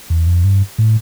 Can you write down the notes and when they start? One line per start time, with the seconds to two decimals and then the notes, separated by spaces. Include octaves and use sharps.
0.10 E2
0.27 F2
0.44 G2
0.78 A2